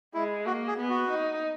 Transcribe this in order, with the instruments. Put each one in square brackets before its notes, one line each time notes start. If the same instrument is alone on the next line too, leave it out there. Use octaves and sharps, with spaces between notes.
[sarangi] G#3 [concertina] E4
[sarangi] A#3 [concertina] F#4
[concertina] G#4
[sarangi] B3
[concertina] F#4
[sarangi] D#4